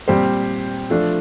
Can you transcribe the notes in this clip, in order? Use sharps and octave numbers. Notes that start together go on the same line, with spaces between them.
A#2 G3 C4 G4 C5
F3 A3 D4 F4 A4